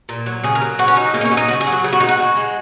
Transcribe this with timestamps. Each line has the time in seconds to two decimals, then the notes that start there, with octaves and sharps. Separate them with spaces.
0.09 A#2
0.26 F#3
0.43 C#3 G#4
0.55 A#4
0.61 F#3
0.79 C#3 F#4
0.88 C#4
0.96 F#3 D#4
1.14 C#3 A#3
1.21 D#4
1.25 C#4
1.31 F#3
1.37 D#4
1.48 C#3 F#4
1.61 G#4
1.67 F#3
1.72 F#4
1.84 C#3 G#4
1.92 F#4
2.00 G#3 D#4
2.08 F#4
2.19 C#3
2.37 G#3